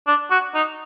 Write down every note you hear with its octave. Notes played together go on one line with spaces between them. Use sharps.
D4
F#4
D#4